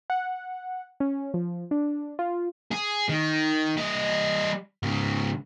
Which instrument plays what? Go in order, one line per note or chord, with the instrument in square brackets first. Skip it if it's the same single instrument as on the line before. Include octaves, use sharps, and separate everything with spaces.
[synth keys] F#5
C#4
F3
D4
F4
[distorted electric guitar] G#4
D#3
G3 D#5
G#2 C#3